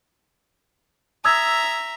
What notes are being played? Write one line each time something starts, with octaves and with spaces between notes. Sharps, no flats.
E5 A#5 D#6 E6 G#6